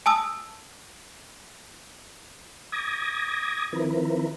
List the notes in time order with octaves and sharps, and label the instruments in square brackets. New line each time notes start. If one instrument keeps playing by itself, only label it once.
[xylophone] G#5 A5 D#6 E6
[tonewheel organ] D6 D#6 G#6 A#6
D#3 F3 C4 E4 A#4 B4